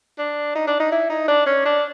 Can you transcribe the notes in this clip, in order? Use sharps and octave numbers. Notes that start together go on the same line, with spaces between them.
D4
D#4
D4
D#4
E4
D#4
D4
C#4
D4